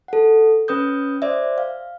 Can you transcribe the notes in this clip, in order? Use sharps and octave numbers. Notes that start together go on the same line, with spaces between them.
A4 F#5
C#4 B4 D#6 G6
C5 D5 E5
F5